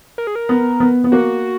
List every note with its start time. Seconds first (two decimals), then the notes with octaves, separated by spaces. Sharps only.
0.18 A#4
0.27 G#4
0.35 A#4
0.49 B3
0.80 B3
1.04 B3
1.12 A#3 F#4